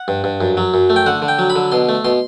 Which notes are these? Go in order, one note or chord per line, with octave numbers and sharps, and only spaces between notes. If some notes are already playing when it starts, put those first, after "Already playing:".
Already playing: F#5
G2
G2
F#2
F#3
F#2
A3
G5
D3 F#5
D3
G5
F#3
B5
D3
B2 C6
A3
B2 C6